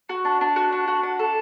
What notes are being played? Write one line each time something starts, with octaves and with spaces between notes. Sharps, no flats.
F#4
D4
D4
F#4
D4
F#4
D4
A4